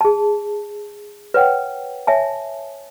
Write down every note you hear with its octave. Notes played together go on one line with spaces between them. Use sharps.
G#4 A5
B4 C#5 F#5 G5
C#5 E5 G#5 A5